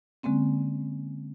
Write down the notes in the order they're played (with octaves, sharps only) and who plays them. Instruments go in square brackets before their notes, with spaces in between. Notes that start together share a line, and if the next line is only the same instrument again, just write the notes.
[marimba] D3 G#3 A#3 C4 C#4